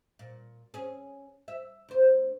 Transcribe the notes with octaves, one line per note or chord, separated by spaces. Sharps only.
A#2
C#4 G#4
E5
D2 C5